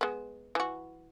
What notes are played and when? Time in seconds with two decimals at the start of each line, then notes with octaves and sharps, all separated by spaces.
0.01 G#3 B3
0.55 E3 F#4